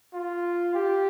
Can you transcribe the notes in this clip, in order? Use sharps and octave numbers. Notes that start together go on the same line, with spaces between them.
F4
G4